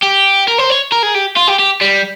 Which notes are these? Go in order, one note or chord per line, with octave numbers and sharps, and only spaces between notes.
G4
A#4
C5
C#5
A#4
G#4
G4
F4
G4
G4
G3